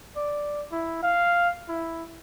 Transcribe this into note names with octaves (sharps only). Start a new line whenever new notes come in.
D5
E4
F5
E4